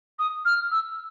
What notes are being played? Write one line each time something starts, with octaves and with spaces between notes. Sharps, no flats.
D#6
F6
E6